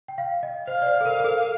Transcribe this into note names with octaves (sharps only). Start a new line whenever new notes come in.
G5
F5
D#5
C5 F5
D5
C5
A4
A#4
A#4
A4